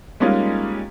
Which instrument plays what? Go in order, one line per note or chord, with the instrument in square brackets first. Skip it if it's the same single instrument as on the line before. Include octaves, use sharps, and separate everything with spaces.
[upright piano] G3 G#3 A#3 C#4 D#4 F4